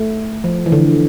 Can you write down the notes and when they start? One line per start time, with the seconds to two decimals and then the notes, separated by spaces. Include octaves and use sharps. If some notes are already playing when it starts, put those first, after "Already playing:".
Already playing: A3
0.44 F3
0.66 E3
0.72 D3